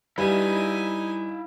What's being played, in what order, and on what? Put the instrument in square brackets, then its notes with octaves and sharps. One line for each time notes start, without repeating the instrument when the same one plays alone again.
[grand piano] G3 B4 [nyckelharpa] D#4 G#5 [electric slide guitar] E4 E5 F5